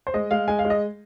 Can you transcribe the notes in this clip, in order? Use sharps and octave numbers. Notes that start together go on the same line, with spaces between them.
C5
G#3 D#5
G#3 F5
G#3 G#5
F5
G#3
D#5